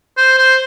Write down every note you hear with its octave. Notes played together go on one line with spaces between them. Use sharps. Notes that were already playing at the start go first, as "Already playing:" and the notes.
C5
C5